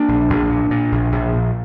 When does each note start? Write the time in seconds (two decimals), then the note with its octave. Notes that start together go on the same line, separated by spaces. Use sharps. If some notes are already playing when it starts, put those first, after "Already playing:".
Already playing: A#3 D4
0.08 A#1
0.30 A#1
0.50 A#2
0.71 A#2
0.92 A#1
1.12 A#1
1.33 A#2